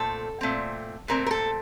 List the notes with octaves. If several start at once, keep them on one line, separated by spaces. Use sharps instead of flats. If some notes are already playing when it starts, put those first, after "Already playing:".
Already playing: A#2 A3 C4 A4
A#2 A3 C4
A#2 A3 C4 A#4
A#4
A4